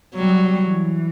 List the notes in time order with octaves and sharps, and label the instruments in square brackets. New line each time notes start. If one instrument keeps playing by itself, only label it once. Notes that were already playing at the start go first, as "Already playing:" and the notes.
[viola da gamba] F#3 [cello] G3
[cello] E3